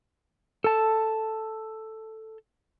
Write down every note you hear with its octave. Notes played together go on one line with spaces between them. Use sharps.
A4 A5